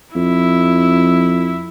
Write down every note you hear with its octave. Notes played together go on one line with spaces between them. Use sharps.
F2 E4